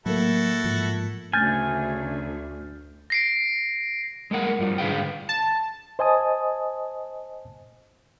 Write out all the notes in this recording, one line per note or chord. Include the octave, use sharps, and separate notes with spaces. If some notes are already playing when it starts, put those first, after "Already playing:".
A2 F#3 A3 A#3 E4 F#4 A4
G#2 F3
D2 C#3 A3 G#5 F6 G6 A6
A#6 C7 D7
G#3 A#3 A#4 F#5
G2 F3 G3
G#2 D3 G#4 B4 F5 G5
A5
C5 D#5 G#5 A5 D#6